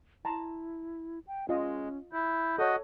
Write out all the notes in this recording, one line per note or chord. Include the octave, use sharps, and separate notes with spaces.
E4 A5 A#5 C6
G5
G#3 C#4 F4 D#5
E4 G6
F#4 A4 C#5 D#5